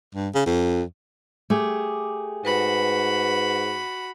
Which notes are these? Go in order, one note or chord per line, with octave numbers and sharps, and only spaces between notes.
G2
C#3
F2
A3 G4 G#4 D6
G#2 F#4 B4 B5